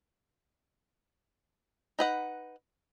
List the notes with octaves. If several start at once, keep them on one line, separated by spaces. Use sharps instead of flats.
D#4 B4 F#5